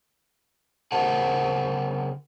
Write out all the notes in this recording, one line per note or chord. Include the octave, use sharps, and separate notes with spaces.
C#3 A#4 C5 F#5 A5